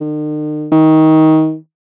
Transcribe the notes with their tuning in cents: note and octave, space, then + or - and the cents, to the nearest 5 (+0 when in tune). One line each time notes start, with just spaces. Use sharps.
D#3 -45
D#3 +20